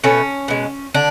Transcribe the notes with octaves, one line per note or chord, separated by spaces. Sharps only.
B2 A3 C#4
B2 G#3
D3 D4